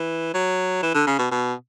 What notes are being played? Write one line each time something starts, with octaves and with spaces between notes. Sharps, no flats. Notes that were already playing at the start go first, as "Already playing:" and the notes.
Already playing: E3
F#3
E3
D3
C#3
B2
B2